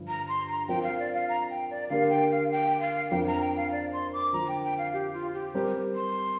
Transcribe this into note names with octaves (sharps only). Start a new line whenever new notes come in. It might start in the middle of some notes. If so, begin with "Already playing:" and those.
Already playing: G2 D3 F3 D4
A#5
C6
A#5
F3 C4 F4 A#4 G5
F5
D5
F5
A#5
G5
D5
D3 A#3 G4 A#4 F5
G5
F5
G5
F5
F2 F3 D4 A#4 G5
A#5
G5
F5
D5
C6
D6
D3 F3 A#3 A#5
G5
G5
F5
G4
F4
G4
G3 C4 G4 A#4
C6